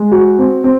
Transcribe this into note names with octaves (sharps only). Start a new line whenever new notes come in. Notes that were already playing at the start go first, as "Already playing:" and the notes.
Already playing: G#3
F#4
C4
C4